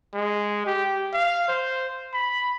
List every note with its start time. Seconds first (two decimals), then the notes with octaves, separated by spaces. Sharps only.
0.14 G#3
0.66 G4
1.13 F5
1.48 C5
2.14 B5